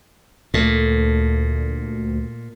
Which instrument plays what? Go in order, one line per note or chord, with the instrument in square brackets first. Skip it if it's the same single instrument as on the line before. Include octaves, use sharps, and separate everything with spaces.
[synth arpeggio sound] D2 [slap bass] A#2 [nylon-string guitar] A3